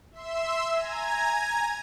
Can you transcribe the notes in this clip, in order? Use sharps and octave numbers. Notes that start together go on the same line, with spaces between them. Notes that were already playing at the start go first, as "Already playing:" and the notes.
E5 C6 E6
G#5 A#5 G#6